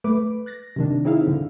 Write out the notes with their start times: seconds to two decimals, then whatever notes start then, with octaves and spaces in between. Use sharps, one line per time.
0.04 A3 B4 D6
0.46 F#6 A6 A#6
0.76 C3 D#3 D4
1.05 C4 D#4 E4 G#4 E5 F5
1.27 D3